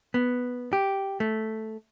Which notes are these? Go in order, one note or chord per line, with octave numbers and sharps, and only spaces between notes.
B3
G4
A3